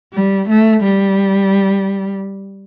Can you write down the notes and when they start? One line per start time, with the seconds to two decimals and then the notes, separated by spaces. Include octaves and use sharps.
0.13 G3
0.49 A3
0.83 G3